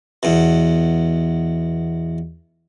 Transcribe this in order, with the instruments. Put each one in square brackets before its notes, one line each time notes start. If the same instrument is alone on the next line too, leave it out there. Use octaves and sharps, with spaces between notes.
[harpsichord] E2 B2